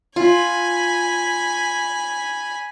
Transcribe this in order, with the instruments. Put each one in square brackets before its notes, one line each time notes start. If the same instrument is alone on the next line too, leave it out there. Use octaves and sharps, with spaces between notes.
[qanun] F4 [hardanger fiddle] G#5 B5